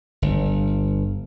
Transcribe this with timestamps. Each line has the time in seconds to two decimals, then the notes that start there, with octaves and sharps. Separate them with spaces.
0.22 G1